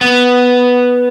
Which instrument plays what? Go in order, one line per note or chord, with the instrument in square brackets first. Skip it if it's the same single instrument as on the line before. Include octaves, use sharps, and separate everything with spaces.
[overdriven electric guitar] B3